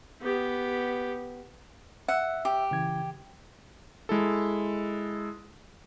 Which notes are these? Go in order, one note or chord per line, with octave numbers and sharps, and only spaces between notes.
B3 G4
E5 F#5 E6
G4
C#3 E3 G#6
G#3 E4 A4